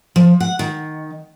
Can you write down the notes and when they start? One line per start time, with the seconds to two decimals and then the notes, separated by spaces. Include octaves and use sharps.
0.16 F3
0.40 F#5
0.59 D#3